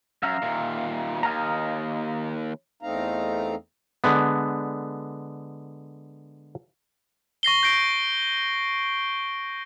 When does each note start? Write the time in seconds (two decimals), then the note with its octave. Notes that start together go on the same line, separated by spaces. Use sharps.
0.23 F#2 E5 F5 A#5
0.42 D#2 A#2
1.23 D#2 D#5 F5 A#5
2.83 E2 A3 C4 D#4 F5 A#5
4.04 D3 G#3 B3
7.43 C#6 A#6 C7 G7
7.63 G6 A#6 C7 D7